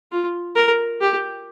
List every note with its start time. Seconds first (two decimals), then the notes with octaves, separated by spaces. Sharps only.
0.12 F4
0.56 A#4
1.01 G4